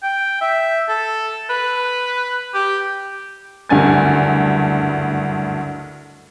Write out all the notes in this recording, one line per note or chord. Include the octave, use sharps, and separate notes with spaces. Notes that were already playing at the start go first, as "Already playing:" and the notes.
G5
E5
A4
B4
G4
F#1 D2 G2 G#5 A6